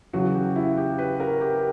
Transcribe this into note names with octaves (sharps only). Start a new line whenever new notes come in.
E2 C#3 F#3 F#4
G4
E4
G4
B4
A#4
G4